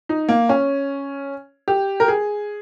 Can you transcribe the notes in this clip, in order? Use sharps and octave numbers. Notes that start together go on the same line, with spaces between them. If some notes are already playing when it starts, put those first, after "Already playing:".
D#4
A#3
C#4
G4
A#4
G#4